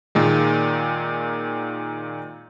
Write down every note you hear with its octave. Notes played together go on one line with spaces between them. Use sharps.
A#2 D#3 G#3